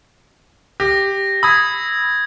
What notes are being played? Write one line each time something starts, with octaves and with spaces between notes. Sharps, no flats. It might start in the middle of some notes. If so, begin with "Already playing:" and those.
G4 A#6
B5 D#6 E6 G#6